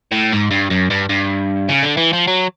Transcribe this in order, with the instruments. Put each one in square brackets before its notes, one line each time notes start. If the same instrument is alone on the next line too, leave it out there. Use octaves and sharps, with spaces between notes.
[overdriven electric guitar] A2
G#2
G2
F#2
G2
G2
C#3
D3
E3
F3
F#3